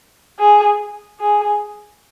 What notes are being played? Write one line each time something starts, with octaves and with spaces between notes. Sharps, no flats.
G#4
G#4